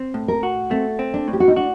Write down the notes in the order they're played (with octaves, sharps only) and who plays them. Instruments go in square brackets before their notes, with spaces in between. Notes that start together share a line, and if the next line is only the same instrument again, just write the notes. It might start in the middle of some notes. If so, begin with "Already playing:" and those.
Already playing: [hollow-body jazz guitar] C4
A2
[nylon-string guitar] A#4
[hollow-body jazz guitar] F#4
[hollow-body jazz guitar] A3 [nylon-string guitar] C4
[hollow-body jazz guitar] C4
[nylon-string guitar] D4
[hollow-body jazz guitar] A2
[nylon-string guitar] G4
F#4
D#4
[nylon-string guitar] D4 [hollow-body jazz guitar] F#4